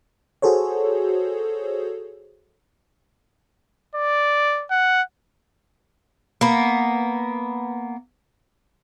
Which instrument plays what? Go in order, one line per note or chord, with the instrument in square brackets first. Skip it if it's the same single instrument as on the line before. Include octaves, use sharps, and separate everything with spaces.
[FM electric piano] F#4 G#4 A4 C5 C#5
[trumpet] D5
F#5
[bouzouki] A#3 B3